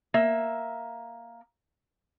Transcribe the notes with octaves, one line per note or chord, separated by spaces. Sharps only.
A#3 E5